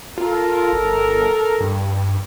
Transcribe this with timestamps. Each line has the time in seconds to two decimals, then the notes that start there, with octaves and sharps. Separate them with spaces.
0.18 F4 A4 A#4
0.73 G1
1.60 G2